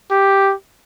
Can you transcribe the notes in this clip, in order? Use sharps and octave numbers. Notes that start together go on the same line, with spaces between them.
G4